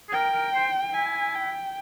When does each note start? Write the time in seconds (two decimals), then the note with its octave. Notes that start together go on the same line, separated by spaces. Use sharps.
0.09 G#4
0.13 A#4 G5
0.33 A#4
0.54 C5
0.93 E4 G#5
1.35 G5